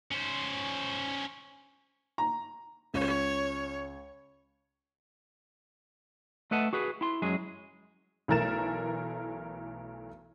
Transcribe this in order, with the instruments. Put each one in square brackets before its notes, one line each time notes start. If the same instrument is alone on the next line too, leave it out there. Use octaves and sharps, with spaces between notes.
[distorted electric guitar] C#4 C5
[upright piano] A#5
[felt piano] C#2 [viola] C#5
[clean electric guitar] A3 A4 B4 D#5 F#5 A5
F#4 G#4 B4
E4 C6
F#2 F#3 G#3 G#4
[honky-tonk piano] B1 E3 A3 A#4 A6 E7